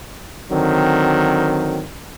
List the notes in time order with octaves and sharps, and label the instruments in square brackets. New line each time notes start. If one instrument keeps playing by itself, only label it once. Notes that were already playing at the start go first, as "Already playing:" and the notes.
[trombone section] D3 D#3 F#3 C4